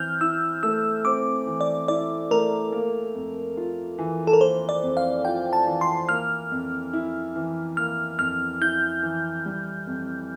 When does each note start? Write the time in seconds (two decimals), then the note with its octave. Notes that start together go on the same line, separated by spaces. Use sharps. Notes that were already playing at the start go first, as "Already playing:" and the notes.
Already playing: E3 C4 F6 G6
0.21 E4 E6
0.63 A3 E6
1.05 C4 D6
1.47 E3
1.61 D5
1.88 E4 D5
2.31 A3 A#4
2.72 A#3
3.15 F2
3.57 F4
3.98 E3
4.27 A4
4.33 A#4
4.40 A#3 C5
4.69 D5
4.83 F2
4.97 F5
5.25 F4 G5
5.53 A5
5.67 E3
5.81 C6
6.09 A#3 F6
6.51 F2
6.93 E4
7.36 E3
7.77 A#3 F6
8.19 F2 F6
8.61 E4 G6
9.03 E3
9.46 G3
9.87 F2